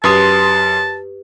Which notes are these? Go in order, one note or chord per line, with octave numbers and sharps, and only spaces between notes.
F#2 G4 B4 A5 C6 D#6